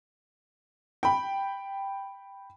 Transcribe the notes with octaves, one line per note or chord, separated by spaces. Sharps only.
G5 B5